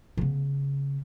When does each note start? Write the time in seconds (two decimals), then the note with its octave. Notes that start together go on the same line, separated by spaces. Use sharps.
0.17 C#3 B3